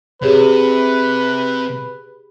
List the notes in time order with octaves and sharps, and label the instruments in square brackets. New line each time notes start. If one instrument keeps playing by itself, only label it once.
[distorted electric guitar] C3 [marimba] G4 G#4 C#5 [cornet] B4